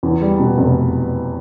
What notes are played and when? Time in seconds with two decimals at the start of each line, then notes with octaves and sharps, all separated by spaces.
0.03 E2
0.21 G3
0.39 B2
0.58 F1